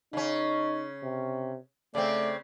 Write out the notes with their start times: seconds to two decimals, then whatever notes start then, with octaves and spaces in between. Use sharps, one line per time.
0.13 C#3 C#4 D#4
1.03 C3
1.95 C#3 A3 C4 D5